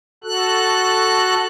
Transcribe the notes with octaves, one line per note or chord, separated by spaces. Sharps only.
F#4 A4 F#6